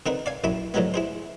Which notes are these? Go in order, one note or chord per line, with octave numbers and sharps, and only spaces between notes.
D3 C4 D#4 A#4 B4
D5 F5 G#5
A#1 F#2 E4 B5
A2 D3 F3 F#3 G#3 B3
E4 G#4 C5